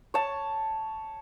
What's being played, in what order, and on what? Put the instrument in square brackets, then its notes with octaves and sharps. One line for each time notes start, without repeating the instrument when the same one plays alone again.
[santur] C#5 A5